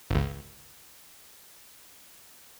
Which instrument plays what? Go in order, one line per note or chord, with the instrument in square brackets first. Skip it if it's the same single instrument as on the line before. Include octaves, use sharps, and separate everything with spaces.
[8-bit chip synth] G1 C#2